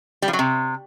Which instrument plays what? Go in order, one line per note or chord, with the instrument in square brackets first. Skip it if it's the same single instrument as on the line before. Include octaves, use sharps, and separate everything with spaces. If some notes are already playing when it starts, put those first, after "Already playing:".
[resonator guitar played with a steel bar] G3
F3
F#3
C3